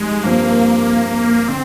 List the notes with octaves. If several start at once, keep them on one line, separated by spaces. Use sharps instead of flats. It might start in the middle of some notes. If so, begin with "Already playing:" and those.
Already playing: F2 D#3 G3 G#3
G2 F3 A#3 C4
D3 C4